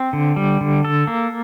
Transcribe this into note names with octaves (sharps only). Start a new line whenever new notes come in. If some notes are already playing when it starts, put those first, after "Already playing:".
Already playing: C4
D3
G3
D3
A4
A#3